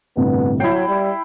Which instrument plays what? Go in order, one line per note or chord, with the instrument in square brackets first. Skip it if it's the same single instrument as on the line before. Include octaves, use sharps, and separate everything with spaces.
[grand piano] G1 A2 C3 [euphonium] B3
[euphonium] F#3 [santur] E4 G5 [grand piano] C7
[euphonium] G3